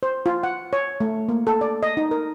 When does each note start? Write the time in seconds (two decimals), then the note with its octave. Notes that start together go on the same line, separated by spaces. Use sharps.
0.03 C5
0.26 F4
0.43 F#5
0.73 C#5
1.00 A3
1.29 A#3
1.47 A4
1.61 D5
1.83 D#5
1.97 D#4
2.11 A#4